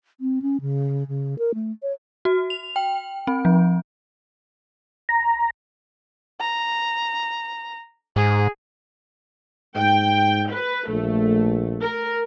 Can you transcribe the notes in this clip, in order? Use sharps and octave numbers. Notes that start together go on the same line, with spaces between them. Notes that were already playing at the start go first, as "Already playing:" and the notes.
C4
C#4
C#3
C#3
A#4
A3
C#5
F#4
F7
G5
C4
F3
A#5
A#5
G#2 G#4
G#2 G5
B4
A#1 A3
A#4